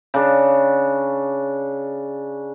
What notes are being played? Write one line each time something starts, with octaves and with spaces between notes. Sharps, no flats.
C#3 D4